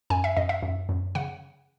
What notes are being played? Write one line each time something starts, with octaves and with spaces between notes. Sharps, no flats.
F#2 G#5
E5
F#2 D#5
E5
F#2
F#2
C#3 F#5